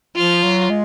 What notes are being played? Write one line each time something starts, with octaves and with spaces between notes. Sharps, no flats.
F3 F4
F#3
G#3